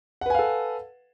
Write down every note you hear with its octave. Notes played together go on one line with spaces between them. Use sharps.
A4 B4 F5 F#5 G#5